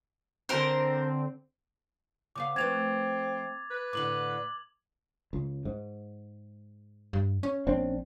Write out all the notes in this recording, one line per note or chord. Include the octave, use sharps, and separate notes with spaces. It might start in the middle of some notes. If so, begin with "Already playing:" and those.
D3 C4 A#4 C5
C#3 B3 F5 D6
F3 A3 C4 B4 G#6 A6 F7
B4
A2 D3 D6 F#7
C#2
G#2
G2
C#4
A#1 C4 D4